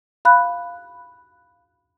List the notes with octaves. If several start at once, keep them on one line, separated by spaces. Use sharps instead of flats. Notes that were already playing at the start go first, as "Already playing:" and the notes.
F5 B5 F#6